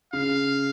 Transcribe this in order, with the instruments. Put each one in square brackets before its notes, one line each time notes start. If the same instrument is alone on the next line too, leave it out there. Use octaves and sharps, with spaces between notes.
[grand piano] C#3 [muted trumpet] F5